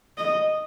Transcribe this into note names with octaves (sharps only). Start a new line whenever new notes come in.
D#5